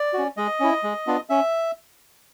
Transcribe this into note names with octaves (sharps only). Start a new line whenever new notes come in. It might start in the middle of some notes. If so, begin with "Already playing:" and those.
Already playing: D5
C#4 F#4
G#3 D#5
C#4 E4
G#3
B3 D4 F4
C#4 E5